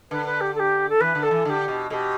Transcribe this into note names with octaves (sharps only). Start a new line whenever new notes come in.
D3 B4
B4
G4
A4
G4
A4
E3 B4
D3
A4
E3
D3 G4 A4
B2
B2 G4 A4